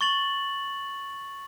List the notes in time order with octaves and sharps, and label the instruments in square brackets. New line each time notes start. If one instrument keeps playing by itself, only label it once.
[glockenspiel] C#6 A6 F#7